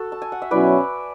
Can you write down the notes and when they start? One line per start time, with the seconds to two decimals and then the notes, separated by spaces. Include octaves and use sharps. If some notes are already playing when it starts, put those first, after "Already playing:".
Already playing: F#4 A4
0.12 A5
0.22 G#5
0.32 F#5
0.42 E5
0.51 B2 F#3 C#4 E4 B4 D5